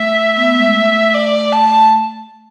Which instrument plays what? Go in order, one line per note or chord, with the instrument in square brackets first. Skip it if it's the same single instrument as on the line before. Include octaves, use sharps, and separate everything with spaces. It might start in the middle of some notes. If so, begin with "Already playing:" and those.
Already playing: [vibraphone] A3 [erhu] E5
[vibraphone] B3
A3
G#3
A3
[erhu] D5
A5